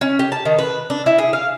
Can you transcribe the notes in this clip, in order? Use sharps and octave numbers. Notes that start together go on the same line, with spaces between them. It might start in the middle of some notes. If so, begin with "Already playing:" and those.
C#4
G4
A5
D#3
B4
D4
E4
G#4
F5